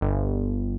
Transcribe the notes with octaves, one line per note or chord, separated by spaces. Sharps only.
G1